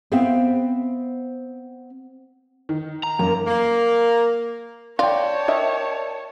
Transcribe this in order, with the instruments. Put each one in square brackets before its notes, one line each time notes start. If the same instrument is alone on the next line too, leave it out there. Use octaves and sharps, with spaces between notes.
[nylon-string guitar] B3 C4 C5 E5 F5 G5
[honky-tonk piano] D#3
[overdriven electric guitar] A#5
[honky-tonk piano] F#2 [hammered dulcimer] A#3
[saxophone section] A#3
[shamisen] F4 [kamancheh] C#5 A5 [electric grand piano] D5 G5
[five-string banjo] A#4 D#5 E5